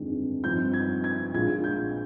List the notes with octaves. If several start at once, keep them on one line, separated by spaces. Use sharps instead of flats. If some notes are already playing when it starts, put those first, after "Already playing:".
Already playing: G1 F2 D#3 G#3 D4
G2 F3 C4 D#4 G6
G#6
G#6
A#1 A#2 G#3 D4 F4 G#6
G6